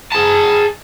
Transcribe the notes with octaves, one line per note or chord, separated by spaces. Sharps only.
G#4 A5